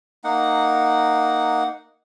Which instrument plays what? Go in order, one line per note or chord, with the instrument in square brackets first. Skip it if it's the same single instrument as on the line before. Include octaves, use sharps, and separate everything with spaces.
[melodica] A#3 D#4 F#5